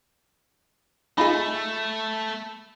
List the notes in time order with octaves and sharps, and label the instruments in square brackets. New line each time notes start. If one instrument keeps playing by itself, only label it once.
[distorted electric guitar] A3 [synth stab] D#4 F4 G#4 [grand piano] B5